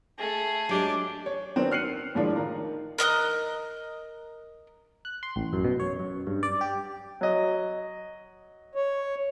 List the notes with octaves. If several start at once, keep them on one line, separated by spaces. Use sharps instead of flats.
A3 G#4
F#3 G#3 D4 G4
C#5
D#3 F#3 B3 C4 D4
F6 F#6 C7 C#7 D#7 F#7
A2 D#3 F3 G#3 D4 F4
D#3 A#5
A#4 D#5 D#6 F#6
F#6
C6
A1
F#2
B2
C#5
F#2
G2
D5
G4
F#3 D#5
C#5